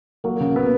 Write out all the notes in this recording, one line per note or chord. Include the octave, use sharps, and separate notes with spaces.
F#3 A#3
C#3
B3